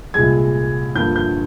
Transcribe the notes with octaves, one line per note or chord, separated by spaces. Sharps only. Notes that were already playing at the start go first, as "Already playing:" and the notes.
C2 A#2 G#3 G#6
G2 D3 F3 A#3 G6
G6